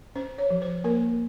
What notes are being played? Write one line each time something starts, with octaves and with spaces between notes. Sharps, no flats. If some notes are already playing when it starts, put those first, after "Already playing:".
C#4 C5
C#5
F3
C5
A#3 A#4